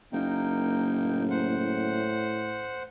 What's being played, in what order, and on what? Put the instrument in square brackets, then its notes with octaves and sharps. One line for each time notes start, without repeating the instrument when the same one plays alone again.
[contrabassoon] F#1 [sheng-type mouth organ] A#3 D#4 G5
[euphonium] A2
[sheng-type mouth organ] C5 F#5